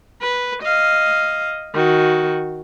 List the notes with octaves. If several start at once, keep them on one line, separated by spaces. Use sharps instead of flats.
B4
D#5 F5
D#3 F#4